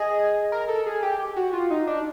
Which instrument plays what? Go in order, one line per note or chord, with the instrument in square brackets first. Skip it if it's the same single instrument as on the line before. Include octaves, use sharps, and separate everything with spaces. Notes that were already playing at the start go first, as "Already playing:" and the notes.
Already playing: [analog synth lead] G#4 [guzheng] D#5
[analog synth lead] A#4
A4
G#4
G4
G4
F#4
F4
D#4
D4